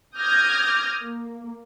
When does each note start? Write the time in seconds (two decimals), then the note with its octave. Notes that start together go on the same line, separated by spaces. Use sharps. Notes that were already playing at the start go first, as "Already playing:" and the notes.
0.16 D6 D#6 F6 G6 G#6 A#6
1.00 A#3